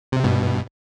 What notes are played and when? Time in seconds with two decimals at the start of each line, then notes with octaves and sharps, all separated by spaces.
0.12 C3
0.24 G2 B2